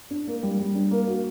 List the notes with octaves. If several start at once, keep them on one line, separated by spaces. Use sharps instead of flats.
D4
A#3
G3
G3
D4
A#3
F#4